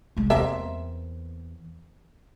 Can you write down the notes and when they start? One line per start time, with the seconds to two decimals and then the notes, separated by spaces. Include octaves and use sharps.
0.17 C2 G#3
0.30 E2 A#3 C4 E5